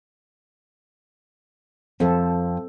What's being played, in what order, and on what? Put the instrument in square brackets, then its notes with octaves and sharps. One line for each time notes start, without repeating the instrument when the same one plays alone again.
[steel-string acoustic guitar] F2 [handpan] C4 A4